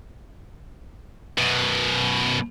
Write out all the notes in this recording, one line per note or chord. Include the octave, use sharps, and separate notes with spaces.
F#2 B2